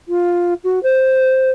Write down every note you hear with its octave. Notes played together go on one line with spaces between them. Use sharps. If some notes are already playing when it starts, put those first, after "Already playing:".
F4
F#4
C5